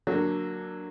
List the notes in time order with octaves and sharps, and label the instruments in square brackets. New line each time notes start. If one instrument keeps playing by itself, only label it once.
[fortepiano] D3 F#3 A#3